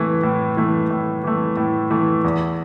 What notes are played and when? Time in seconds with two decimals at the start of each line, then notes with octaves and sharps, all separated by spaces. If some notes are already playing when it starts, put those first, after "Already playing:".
Already playing: A2 E3 A3
0.23 A2
0.57 E3 A3
0.90 A2
1.24 E3 A3
1.57 A2
1.90 E3 A3
2.24 E2